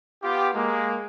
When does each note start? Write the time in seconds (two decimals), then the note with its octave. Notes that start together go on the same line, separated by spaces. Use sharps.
0.22 B3 F4 G4
0.54 G#3 A#3